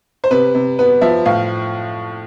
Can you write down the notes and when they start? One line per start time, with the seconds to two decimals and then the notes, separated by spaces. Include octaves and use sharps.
0.24 C5
0.31 C3 B4
0.55 C3
0.79 B3 B4
1.01 F3 E5
1.26 A2 F5